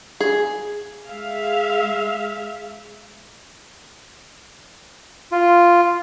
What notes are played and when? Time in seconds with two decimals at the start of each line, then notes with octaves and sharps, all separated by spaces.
0.20 G#4
1.08 G#3 E5 F5
5.32 F4